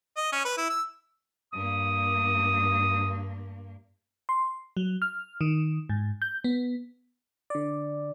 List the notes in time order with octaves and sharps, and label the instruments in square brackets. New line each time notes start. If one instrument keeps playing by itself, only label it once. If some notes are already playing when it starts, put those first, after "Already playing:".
[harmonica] D#5
C#4
B4
E4
E6
[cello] G2 A#3 [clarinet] D#6
[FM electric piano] C6
F#3
F6
D#3
G#2
G6
B3
D3 D5